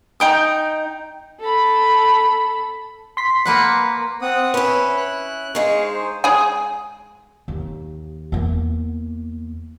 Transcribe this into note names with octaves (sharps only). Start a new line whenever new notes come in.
D#4 G5 D#6
A4 B5
C6 B6
A#3 B4 F#5
C4 F#5 D#6
C#4 E4 B4
F#6
G#3 D#4 G#4 F5 C#6
C5
G#3 G#4 G#5
D#2
E2 A#3